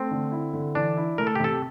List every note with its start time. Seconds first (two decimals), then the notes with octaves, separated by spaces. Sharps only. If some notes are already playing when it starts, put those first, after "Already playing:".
Already playing: A3 C4
0.11 D3
0.32 E4
0.53 D3
0.75 E3 D4
0.97 E4
1.18 A3 A#4
1.27 A4
1.35 G4
1.40 C3 A4